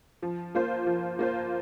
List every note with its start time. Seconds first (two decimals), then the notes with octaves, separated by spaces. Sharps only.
0.23 F3
0.55 A#3 F4 C5
0.87 F3
1.19 A#3 F4 C5